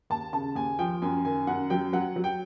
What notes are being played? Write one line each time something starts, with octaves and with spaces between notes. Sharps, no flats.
D#2 A5
C#3 A5
D#2 G#5
F3 G5
F#2 G#5
D#3 G#5
F#2 F#5
F#3 G5
F#3 F#5
F#3
G5